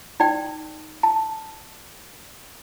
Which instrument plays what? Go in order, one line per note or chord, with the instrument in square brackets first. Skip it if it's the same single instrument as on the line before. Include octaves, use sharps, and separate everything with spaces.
[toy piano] D#4 D5 G5
A5